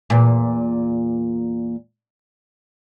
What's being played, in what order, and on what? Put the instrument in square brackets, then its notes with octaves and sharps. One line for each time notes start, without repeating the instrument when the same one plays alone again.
[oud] E2 A#2